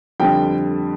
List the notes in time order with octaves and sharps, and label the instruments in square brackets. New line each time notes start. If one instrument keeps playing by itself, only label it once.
[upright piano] F2 D3 G3 G5